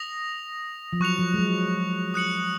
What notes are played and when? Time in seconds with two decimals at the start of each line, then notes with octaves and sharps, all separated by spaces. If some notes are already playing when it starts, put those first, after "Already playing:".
Already playing: D#6 A#6 F7
0.93 F3
1.00 F#3 C#6 F#6 C#7 F7
1.19 F3
1.34 G#3
1.38 F#3
2.14 D#6 F#6 C#7 F#7